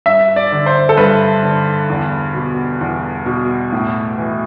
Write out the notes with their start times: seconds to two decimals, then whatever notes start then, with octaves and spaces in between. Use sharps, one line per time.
0.06 G2 E5
0.36 D5
0.52 D3
0.66 C5
0.89 A4
0.97 G2 B4
1.43 D3
1.90 E2
2.35 B2
2.81 E2
3.26 B2
3.72 A2
4.18 E3